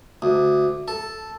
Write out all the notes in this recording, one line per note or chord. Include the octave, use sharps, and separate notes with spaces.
D2
A4